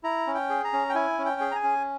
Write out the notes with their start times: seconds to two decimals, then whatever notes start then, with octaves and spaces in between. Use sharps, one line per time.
0.03 E4 A#5
0.27 C#4
0.35 G5
0.50 G#4
0.64 A#5
0.73 C#4
0.89 G5
0.95 E4 G#5
1.18 C#4
1.26 G5
1.41 G#4
1.51 A#5
1.55 G#5
1.63 C#4